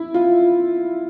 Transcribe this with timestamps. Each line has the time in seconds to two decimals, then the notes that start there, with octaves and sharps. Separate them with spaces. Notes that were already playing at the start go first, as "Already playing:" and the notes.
Already playing: E4
0.14 F4